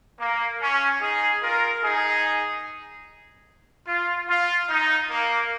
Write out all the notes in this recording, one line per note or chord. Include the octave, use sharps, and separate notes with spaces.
A#3
C#4
D#4 G#4
F4 A#4
D#4 G#4
F4
F4
D#4
A#3